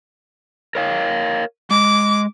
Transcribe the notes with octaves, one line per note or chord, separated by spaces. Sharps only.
A#4 C#5 F5
G#3 D6